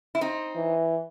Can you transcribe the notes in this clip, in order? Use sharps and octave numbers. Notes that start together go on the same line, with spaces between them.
E4
C4 D#4
E3